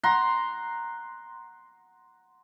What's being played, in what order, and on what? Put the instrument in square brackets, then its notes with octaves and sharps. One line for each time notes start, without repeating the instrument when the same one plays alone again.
[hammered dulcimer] F#5 A#5 C6